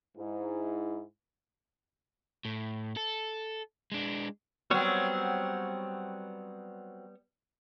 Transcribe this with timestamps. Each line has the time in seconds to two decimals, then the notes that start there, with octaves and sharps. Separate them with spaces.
0.17 G#2 E4
2.45 A2
2.97 A4
3.92 G#3 D4
4.70 F#3 G3 B3 C4 C#5